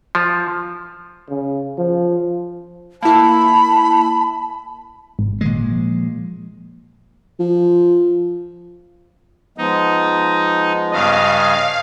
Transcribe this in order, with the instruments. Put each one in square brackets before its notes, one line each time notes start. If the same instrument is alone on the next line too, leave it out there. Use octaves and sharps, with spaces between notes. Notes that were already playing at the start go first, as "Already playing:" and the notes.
[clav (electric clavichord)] F3
[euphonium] C#3
F3
[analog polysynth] A#3 E4 [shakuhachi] A5 [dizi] B5
[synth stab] G#1
[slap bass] A#2 G#3 [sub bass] D#3
[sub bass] F3
[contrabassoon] F3
[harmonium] F3 G#3 B3 [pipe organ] D#4
[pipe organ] G2 C#3 [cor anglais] D#5 [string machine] F5